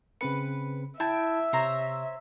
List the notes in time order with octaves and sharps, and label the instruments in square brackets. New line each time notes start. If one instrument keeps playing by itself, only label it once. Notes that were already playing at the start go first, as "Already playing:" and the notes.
[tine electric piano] C#3 C4 C#7 [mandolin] B4
[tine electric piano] E4 A5 G#6 [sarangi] E5 [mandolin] G5
[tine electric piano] C3 [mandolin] C5 C#5 A#5